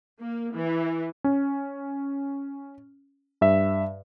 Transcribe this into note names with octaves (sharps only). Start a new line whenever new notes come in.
A#3
E3
C#4
G2 E5